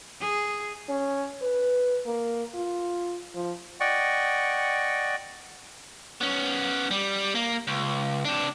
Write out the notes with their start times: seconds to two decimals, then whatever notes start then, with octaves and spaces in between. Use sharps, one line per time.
0.21 G#4
0.89 C#4
1.42 B4
2.06 A#3
2.54 F4
3.34 F3
3.80 D5 D#5 F#5 G5 C#6
6.21 B3 C#4
6.91 G3
7.35 A#3
7.67 C#2
8.25 C3 D4